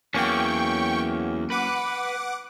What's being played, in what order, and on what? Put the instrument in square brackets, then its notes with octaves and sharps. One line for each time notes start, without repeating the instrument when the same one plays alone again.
[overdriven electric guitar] E2 [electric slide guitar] F#3 A#3 C#4 [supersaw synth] G5 C#6
[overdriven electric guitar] B4 [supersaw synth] F#5 D6